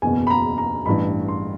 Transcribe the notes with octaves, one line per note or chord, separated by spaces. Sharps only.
F#1 E2 B2 G#5
B5
A#5
A#5
A1 G2 E3 B5
C6